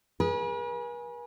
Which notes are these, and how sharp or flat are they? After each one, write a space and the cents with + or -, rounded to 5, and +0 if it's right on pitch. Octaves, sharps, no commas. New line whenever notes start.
G#4 +0 B4 -45